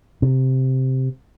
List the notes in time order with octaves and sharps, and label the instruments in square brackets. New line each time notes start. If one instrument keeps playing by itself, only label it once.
[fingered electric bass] C3